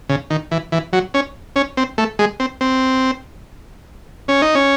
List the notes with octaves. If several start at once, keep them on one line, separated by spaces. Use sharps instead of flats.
C#3
D#3
E3
E3
F#3
C#4
C#4
C4
A3
G#3
C4
C4
C#4
D#4
C#4